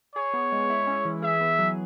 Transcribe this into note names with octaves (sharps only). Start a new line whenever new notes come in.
G#4 C#5
B3
G#3
E4
C#4
E3
G#4 E5
B3
F#3